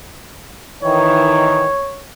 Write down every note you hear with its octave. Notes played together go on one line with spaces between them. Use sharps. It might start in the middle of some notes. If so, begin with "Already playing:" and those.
D#3 E3 C#5